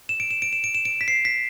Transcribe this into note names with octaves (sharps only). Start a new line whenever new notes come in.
E7
D7
E7
D7
E7
D7
E7
D7
B6
C7
B6